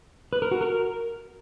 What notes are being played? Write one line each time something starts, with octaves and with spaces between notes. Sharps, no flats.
B4
A#4
F#4
A#4